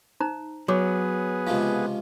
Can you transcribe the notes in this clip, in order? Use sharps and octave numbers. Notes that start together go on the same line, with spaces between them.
D#4 C5 A#5
F#3 B3 G#4 C#5 D6
C#2 C3 F3 F5